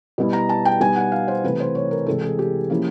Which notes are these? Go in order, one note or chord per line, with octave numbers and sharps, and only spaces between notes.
B2 G3 B3 E4
A#5
A5
G5
B2 G3 B3 D#4 G#5
F#5
F5
C5
C3 E3 A3 B4
C5
C#5
A#4
C3 E3 G#3 A4
G#4
G4
F3 A#3 C#4 E4